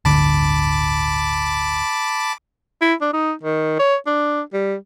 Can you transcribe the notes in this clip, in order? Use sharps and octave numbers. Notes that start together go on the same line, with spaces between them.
D1 G1 D3 A5 B5 D6
E4
D4
D#4
D#3
C#5
D4
G3